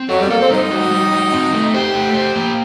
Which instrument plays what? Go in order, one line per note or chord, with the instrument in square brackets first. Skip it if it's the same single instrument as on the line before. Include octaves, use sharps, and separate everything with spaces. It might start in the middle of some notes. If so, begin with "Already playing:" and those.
Already playing: [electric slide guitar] C4
[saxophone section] F#3 [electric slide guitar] A4
[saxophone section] G3
[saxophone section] A#3 [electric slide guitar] A4
[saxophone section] C4
[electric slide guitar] G3 [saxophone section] D#4
[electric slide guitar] F#4
G3
F#4
C4
A3
[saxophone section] G4 [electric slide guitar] C5
[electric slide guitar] A3
C5
A#3